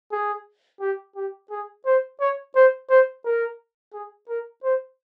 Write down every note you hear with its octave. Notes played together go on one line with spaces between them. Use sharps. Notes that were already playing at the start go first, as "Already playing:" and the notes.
G#4
G4
G4
G#4
C5
C#5
C5
C5
A#4
G#4
A#4
C5